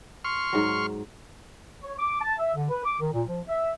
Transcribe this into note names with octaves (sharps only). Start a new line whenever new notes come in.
C6 C#6 F6
G#2 F#3
C#5
D6
A5
E5
D3
B4
D6
D#3
A#2
F3
E5